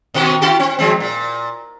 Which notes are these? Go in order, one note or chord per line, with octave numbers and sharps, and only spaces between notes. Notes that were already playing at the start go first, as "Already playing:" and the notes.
B2 D#3 F#4
E4 F#4 G4
C4
F3 G#3 C4
A#2